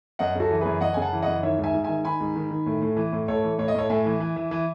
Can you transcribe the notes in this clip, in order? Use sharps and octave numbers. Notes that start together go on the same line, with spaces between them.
F#2 D#5 F#5
C#3 F#4 A4
E3
F#2 G#4 B4
F#2 D#5 F#5
C#3 G#5
F#5 A5
E3
F#2 D#5 F#5
D#3 C#5 E5
G#2
E5 G#5
G#2
D#3 E5 G#5
D#3 G#5 B5
G#2
D#3
D#3
A2
A2
E3
A2
A2 A4 C#5
E3
A2 C#5
D#5
A2 A4 C#5
A2 E5 G#5
E3
E3
E3
E3